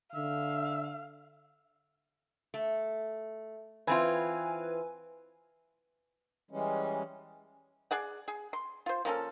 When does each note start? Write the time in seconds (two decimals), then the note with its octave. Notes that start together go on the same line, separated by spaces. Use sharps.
0.15 D3 E5 F5
2.54 A3
3.87 E3 C4 F4 B4 G#5
6.51 E3 G3 G#3 C#4
7.91 G#4 D5 F#5
8.28 G#4
8.53 C6
8.86 F4 C5
9.05 F3 A#3 C#4 A4